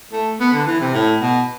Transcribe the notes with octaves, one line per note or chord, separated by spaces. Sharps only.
A3
B3
D3
E3
C3
A2
B2